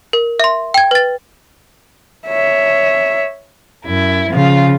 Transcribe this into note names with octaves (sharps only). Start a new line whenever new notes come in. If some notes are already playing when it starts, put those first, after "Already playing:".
A#4
E5 C6
G5 G#6
B4 A6
C#5 E5
F#2 E4
C#3 F3 F4